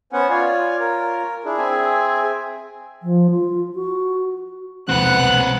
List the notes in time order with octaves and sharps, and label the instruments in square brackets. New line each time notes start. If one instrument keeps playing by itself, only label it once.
[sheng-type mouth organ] B3 C#4 F#5 [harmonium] C5 G#5
[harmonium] F4 C#5 [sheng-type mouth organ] D5 F5 G#5
[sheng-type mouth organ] A#4
[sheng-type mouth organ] D4 E4 [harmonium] G#4
[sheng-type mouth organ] C4 E5 G#5
[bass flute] F3
F4
F#4
[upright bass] E1 C2 [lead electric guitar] C4 B4 [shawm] F#5 [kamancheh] F#6